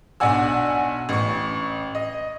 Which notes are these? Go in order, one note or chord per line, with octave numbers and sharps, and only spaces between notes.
B1 D4 D5 F#5 G#5 E6
A1 C#6
D#5